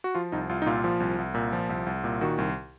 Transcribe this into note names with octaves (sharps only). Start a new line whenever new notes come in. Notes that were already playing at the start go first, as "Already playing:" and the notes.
F#4
F3 F4
C2 D#4
C2 F4
D#4
A#2 F4
F3
C2
C2
A#2
F3
C2
C2
A#2
D#3 F#4
C2